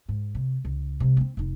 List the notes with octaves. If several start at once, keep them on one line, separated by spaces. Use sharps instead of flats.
G#2
C3
C#2
C3 G#3
A#3 C4
F1 D#4